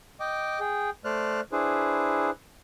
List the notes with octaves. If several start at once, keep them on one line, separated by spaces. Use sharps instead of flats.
D#5 G5 D6
G#4 G5
A3 C5 D5 F6 F#6
D4 E4 G#4 B4 C5